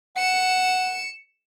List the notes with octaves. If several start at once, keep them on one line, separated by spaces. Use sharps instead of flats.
F#5 C#7 E7